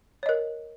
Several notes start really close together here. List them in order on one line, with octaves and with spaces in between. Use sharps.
C#5 D#5 A#4